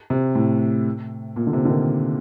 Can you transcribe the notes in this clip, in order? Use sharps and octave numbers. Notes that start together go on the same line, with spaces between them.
C3
A2
A#2
D3
C3
D3
D#3